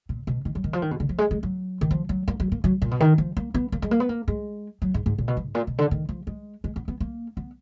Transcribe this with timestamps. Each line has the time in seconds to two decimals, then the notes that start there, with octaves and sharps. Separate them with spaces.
0.09 A#2
0.27 B2
0.45 D#3
0.55 F#3
0.64 D#3
0.73 F3
0.82 D#3
0.91 B2
1.00 D3
1.09 F3
1.18 G#3
1.31 G#3
1.43 F#3
1.81 D#3
1.91 F3
2.09 F#3
2.28 A#3
2.40 F#3
2.52 A#3
2.64 F#3
2.82 A#2
2.91 B2
3.00 D#3
3.18 F3
3.37 A#3
3.54 B3
3.72 A#3
3.82 G#3
3.91 A#3
4.00 B3
4.09 A#3
4.28 G#3
4.82 F#3
4.94 G#2
5.06 G#2
5.18 A#2
5.28 B2
5.37 F3
5.45 G#2
5.55 A#2
5.67 B2
5.78 D3
5.91 D#3
6.09 F3
6.27 G#3
6.64 G#3
6.76 B3
6.88 B3
7.00 A#3
7.37 B3